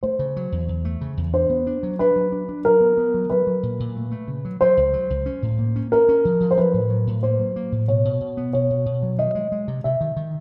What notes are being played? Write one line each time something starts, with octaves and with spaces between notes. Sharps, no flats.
A3 C5
C#3
F#3
E2
E2
A3
C#3
E2
D4 C5
B3
D4
F#3
D4 B4
F#3
D4
D4
F#3 A#4
B3
B3
F#3
F#3 B4
F#3
A#2
A#2
A3
A3
C#3
F#3
F#3 C5
C#2
F#3
C#2
C#4
A2
A#3
C#4
C#4 A#4
C#4
F3
F3
C5
F#3 B4
A2
F#3
A2
A#3 C5
F#3
A#3
A2
B2 C#5
B2
B2
B3
B2 C#5
B2
B2
F#3
D#3 D#5
G#3
G#3
C3
C3 E5
D#3
D#3